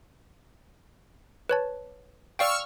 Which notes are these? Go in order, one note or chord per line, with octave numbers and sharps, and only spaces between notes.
B4 C#5 A5
D5 F5 G5 C#6 E6 F6